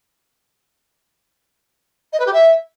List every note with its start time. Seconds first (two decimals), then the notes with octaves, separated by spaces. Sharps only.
2.12 D#5
2.19 B4
2.26 G4
2.33 E5